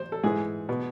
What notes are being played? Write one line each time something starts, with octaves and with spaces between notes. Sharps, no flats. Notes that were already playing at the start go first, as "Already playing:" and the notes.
Already playing: C5
A4
G#2 E3 G#4
B2